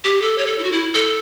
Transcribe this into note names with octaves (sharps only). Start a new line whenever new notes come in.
G4
A4
C#5
A4
E4
F#4
E4
A4